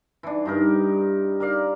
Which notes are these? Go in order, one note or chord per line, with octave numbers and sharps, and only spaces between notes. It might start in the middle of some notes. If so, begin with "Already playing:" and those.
E3 D4
G2 D#4 A#4
A#4 D5 F5